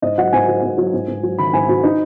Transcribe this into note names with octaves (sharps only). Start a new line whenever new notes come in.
G#2 D#5
F#3 F#5
G#2 G#5
F#3
G#2
F#3
G#2
G#2
F#3
D#3 B5
G#2 G#5
G#2 F#4
D#4